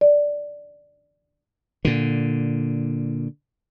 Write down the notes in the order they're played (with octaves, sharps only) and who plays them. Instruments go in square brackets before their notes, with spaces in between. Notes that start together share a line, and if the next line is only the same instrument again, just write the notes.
[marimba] D5
[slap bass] A#2 D3